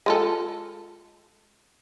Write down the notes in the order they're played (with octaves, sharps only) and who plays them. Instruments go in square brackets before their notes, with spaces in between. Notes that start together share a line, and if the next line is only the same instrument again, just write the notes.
[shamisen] G#3 F4 A4